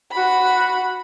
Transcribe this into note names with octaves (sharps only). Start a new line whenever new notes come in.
F#4 B5